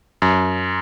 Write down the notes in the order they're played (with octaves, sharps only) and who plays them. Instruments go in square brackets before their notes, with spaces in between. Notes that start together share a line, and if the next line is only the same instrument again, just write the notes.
[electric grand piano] F#2